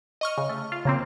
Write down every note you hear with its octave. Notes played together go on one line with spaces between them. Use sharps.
D#5 C#6 F6
C#3
A3
F4
C#3 A#3 C4